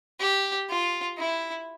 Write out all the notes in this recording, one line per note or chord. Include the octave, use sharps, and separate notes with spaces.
G4
F4
E4